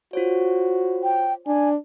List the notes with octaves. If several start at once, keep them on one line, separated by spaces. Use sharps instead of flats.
F4 F#4 C5 C#5
G5
D4 G#5